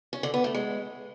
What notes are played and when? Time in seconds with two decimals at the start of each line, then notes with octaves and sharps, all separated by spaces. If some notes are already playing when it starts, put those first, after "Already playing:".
0.13 C#4
0.23 D3
0.34 B3
0.44 A3
0.55 G#3